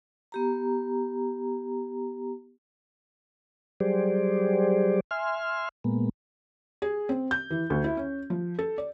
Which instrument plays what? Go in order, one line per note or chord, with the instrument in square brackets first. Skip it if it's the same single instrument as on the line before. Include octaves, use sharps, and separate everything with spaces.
[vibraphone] B3 G4 A#5
[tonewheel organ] F#3 G3 G4 G#4 C5 D5
E5 G#5 C6 F6
A#2 G#3 A#3 B3
[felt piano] G#4
C4
G6
E3
D2
E4
C#4
F3
A4
D5